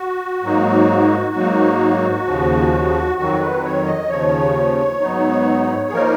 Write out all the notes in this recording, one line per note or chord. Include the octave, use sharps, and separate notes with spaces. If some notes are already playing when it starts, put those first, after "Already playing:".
Already playing: F#4
G#2 F#3 A#3 D#4
G#2 F#3 A#3 D#4
D#2 C#3 F3
F2 D#3 F#3 F#4
B4
C#5
D#5
D#2 C#3 F3 C#5
G#2 F#3 B3 D#4
G#4
F3 A#3 D#4 A#4